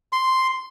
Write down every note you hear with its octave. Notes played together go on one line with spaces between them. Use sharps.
C6